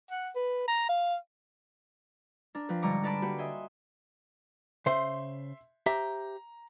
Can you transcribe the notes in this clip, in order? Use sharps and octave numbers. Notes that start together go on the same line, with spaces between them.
F#5
B4
A#5
F5
D4 A#4
F3 C4 B4
G#2 D3 G3 A#5 C#6 D6
A#4 B4 D5 A5 B5 D6
A#3 F#4 G4 B4
D#5 E5 G#5 C6
C#3 C5 E5 C6
G4 C5 E5 A#5